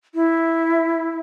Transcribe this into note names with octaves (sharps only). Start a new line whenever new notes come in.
E4